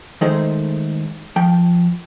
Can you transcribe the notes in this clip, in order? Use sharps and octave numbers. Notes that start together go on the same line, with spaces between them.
D#3 G#3 A3 D#4 G#4 C5
F3 G5